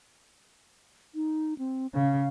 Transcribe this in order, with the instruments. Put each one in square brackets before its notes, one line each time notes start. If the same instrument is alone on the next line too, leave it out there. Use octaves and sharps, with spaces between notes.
[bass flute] D#4
C4
[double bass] C#3 [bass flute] F5